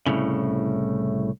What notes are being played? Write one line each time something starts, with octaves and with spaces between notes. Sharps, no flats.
C2 A2 C#3